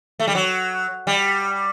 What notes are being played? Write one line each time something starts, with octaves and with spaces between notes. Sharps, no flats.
A3
G3
F#3
G3